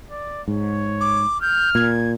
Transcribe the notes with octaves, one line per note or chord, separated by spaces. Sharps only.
D5
G#2 C#5
D6
F6 G6
A#2 G#6